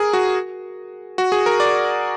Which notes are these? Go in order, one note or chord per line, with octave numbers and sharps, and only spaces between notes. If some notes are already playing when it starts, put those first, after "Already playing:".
Already playing: G#4 A#4
F#4
F#4
G#4
A#4
D5